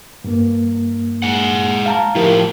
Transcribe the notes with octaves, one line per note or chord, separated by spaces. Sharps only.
G2 A#3
G#3 F#5
F5 A5 A#5
A2 F3 E4 G4 A#4